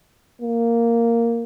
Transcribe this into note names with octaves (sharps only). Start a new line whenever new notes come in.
A#3